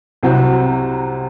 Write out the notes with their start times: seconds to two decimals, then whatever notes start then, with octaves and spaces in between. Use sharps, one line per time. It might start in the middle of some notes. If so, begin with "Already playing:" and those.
0.23 C2 C3 F#3 C4 F#4